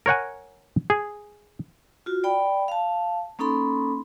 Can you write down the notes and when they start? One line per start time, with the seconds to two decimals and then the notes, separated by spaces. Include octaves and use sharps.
0.06 A#4 C#5 F#5 G#5
0.90 G#4
2.06 F4 F#4
2.24 D5 G5 B5
2.68 F5 A5
3.39 A#3 C#4 D#4 A4 B5 C6